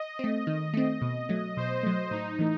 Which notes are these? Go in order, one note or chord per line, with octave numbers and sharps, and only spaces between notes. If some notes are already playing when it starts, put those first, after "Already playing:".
Already playing: D#5
A3 C4
D#3
A3 C4
B2
F#3 A3
B2 C5
F#3 A3
A2 D#4
E3 A3